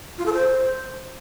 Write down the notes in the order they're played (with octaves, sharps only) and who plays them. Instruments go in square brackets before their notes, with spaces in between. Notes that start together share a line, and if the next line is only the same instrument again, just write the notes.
[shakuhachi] F4
A4
C5